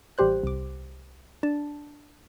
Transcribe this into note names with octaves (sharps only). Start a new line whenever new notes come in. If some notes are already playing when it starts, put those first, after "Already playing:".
A1 G3 G4 C5 F#6
C2 D6
D4 A5